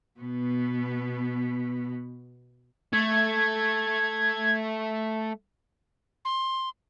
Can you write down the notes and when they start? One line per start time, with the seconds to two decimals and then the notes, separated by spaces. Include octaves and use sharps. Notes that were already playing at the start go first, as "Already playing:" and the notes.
0.20 B2 B3
2.93 A3 G#6
6.25 C6